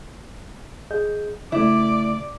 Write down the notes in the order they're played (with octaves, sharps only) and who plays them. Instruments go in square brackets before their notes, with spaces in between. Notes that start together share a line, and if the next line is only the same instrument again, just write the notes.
[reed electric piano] G#4 D#5 G6
[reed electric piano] C#3 A3 [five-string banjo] E4 [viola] D5